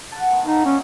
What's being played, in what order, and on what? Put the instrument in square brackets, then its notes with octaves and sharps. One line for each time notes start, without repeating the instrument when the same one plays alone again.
[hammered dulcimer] F#5 A5
D#3 B3
[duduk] D#4 [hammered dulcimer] F5
[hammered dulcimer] A#2 [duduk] C#4